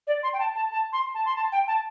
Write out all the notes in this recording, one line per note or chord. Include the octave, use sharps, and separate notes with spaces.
D5
C6
G5
A5
A5
A5
C6
A5
C6
A5
G5
A5